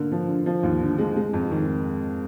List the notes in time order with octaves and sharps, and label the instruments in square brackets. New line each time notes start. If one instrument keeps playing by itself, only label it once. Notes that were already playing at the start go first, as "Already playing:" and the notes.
Already playing: [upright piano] D3 A#3
F3
D3
F3
D#2
D3
G#3
G#3
F2
D#3